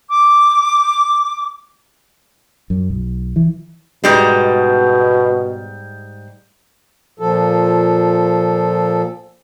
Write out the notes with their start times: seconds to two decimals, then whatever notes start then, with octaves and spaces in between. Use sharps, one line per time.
0.10 D6
2.70 F#2
2.90 B1
3.36 E3
4.04 G#2 B2 G3 G#3
7.20 A#2 F3 A4